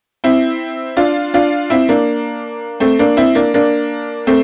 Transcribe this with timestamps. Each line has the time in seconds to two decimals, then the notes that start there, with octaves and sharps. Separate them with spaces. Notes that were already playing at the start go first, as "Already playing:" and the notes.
0.24 C4 E4
0.97 D4 F4
1.34 D4 F4
1.70 C4 E4
1.89 A#3 D4
2.80 A3 C4
2.99 A#3 D4
3.17 C4 E4
3.35 A#3 D4
3.54 A#3 D4
4.27 A3 C4